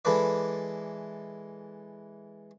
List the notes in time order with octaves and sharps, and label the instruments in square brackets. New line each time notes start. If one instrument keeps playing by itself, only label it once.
[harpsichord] E3 G#3 A4 B4 D5